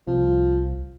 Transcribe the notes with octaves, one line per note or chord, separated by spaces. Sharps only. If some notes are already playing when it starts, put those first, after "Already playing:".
C2 F3